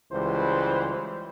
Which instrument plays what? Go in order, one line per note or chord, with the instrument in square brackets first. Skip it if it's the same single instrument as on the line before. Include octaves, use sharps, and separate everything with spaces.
[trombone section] C#2 E3 G3 C5